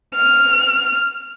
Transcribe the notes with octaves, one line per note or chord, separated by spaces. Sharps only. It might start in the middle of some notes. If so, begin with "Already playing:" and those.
F6